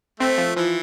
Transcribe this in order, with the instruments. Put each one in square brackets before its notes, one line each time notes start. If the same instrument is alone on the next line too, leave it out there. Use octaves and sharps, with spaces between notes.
[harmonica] A3 [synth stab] C4
[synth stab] F3
[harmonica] E3 [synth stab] F3